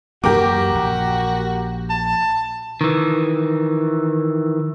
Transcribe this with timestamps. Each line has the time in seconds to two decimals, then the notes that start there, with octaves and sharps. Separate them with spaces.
0.24 F#2 E3 A#3 F#4 G4 A#4 D6
0.74 A#1
1.90 A5
2.81 D#3 E3